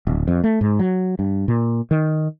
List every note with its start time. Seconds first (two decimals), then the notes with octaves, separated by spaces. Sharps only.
0.07 D1
0.28 F2
0.44 A3
0.61 G#2
0.79 F#3
1.19 G2
1.48 A#2
1.91 D#3